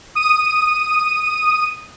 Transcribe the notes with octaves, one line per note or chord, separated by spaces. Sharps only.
D#6 D#7